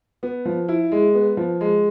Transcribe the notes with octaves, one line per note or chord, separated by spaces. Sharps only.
B3
F3
E4
G#3
B3
F3
G#3